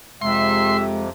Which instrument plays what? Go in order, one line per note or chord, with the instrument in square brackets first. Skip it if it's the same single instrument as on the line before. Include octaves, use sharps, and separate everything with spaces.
[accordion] F2 C3 [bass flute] G#3 [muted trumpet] E5 [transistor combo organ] C6